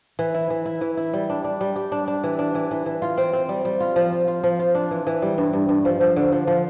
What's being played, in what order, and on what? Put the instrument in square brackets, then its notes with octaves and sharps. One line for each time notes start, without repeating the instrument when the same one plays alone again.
[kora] E3
E4
E3
E4
E3
E4
G3
D4
D4
G3
G4
D4
D4
E3
D4
E3
E3
E3
F4
C4
C4
G3
G3
F4
F3
F4
F4
F3
F4
D4
E3
E3
G3
G2
G2
G2
F3
F3
D3
F3
F3